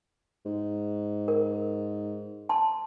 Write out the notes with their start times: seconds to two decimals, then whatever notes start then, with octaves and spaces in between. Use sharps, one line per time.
0.46 G#2
1.28 A#4
2.49 A5 C6